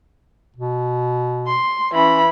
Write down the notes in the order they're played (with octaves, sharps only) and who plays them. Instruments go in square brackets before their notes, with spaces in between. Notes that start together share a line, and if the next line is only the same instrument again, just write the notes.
[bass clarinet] B2
[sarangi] C6
[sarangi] E3 [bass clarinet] C#4 [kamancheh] B5